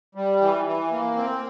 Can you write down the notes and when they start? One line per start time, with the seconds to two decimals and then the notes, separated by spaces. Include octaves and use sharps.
0.15 G3
0.41 E3
0.65 E3
0.91 A#3
1.16 C4